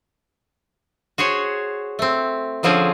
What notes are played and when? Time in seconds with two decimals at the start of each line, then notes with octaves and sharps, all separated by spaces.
1.18 F#4 G#4 C5 C#5
1.99 A3 C4
2.63 D3 F3 C4 C#4 G#4